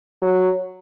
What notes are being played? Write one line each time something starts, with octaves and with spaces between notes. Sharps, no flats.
F#3